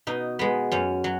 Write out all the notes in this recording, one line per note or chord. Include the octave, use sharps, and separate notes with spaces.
B2 D#4
G#3 B3
F#2 C#4
F#3